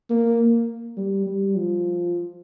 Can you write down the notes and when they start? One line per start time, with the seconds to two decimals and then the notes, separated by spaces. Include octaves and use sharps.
0.10 A#3
0.97 G3
1.26 G3
1.56 F3